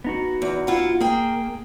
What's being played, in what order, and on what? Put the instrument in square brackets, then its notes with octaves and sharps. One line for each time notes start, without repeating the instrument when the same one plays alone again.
[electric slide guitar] B3 D#4 F#4
[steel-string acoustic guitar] E2
E4 F4 F#5
[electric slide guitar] A#3 [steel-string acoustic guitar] G#4 G5